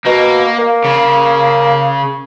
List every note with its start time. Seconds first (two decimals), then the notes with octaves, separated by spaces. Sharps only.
0.05 B2 A#3
0.59 A#3
0.84 C#3